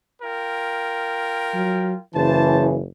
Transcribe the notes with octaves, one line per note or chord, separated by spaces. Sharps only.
F4 A#4 G5
F#3
F#1 C#3 E3 C5 A5